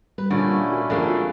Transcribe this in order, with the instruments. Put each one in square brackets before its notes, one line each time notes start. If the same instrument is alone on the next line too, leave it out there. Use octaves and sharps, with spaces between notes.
[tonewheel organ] G3 [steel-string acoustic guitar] B4
[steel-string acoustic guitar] A#2 A#3 D5 [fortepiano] D3 [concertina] A3 C#4 E4
[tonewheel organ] F4 F#4
[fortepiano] F2 G#3 [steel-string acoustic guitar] D3 A#3